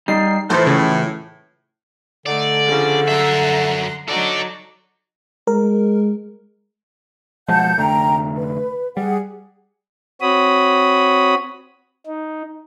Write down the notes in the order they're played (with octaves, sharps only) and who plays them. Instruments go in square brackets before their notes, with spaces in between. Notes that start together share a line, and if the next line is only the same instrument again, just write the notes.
[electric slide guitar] G3 D#4 [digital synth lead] C7
[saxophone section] A2 [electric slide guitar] E3 F3 A3 [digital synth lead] C5
[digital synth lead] C#3
[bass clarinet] D3 [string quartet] A3 D#4 [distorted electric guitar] D5
[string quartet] C#3 F3 D4
[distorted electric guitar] F#2 E5 [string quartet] A#5 C6 F#6
[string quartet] F#3 D#4 F#4 [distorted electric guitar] A4 D5
[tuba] G#3 [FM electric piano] A#4
[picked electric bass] B2 F3 G#3 [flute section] F#5 A5 G6
[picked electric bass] F1 D3 A3 [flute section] G5 A#5
[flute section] B4
[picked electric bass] G3 [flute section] G#4 F#5
[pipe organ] C4 F#4 C#5 B5 D#6
D#4